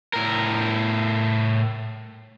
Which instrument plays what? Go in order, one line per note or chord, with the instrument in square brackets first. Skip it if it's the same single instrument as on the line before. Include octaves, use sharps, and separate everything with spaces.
[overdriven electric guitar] A2 A#4